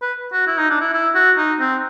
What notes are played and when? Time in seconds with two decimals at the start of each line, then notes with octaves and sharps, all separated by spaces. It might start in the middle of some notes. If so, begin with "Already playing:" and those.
0.02 B4
0.33 F#4
0.47 E4
0.58 D#4
0.70 D4
0.81 E4
0.93 E4
1.15 F#4
1.37 D#4
1.60 C4